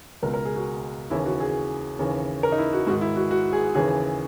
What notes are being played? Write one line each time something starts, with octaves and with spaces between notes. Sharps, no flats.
C#2 B2 A#4
A#4
G#4
F#4
D#2 C#3 E3 E4
F#4
G#4
D#2 C#3 E3
A#4
D#4
E4
F#4
G#2 D#3 F#4
E4
F#4
F#4
G#4
D#2 C#3 E3 G#4